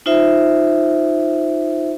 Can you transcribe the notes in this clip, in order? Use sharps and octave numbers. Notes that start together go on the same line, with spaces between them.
D#4 F4 C5 E5